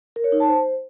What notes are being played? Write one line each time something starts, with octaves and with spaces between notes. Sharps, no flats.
A#4
C#5
D#4
A5
C5